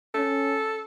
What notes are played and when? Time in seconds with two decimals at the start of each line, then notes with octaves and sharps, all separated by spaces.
0.14 C#4 A4